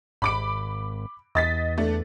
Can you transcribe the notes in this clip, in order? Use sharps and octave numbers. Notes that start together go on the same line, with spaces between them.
G#1 B5 D6 D7
E2 D#5 A6 B6
A3 D4